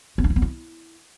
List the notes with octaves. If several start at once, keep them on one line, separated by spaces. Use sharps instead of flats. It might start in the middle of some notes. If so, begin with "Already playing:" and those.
B3
D4
E4
B3
E4